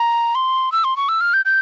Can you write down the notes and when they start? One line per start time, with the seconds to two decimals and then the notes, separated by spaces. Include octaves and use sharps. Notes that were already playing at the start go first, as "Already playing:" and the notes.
Already playing: A#5
0.35 C6
0.72 E6
0.84 C6
0.97 C#6
1.09 E6
1.21 F6
1.34 G6
1.45 G6